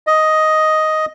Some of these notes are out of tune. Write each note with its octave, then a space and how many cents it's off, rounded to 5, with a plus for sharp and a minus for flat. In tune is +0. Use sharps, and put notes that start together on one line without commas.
D#5 +5